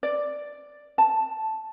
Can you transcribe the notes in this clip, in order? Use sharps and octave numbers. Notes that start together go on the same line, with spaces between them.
D5
A5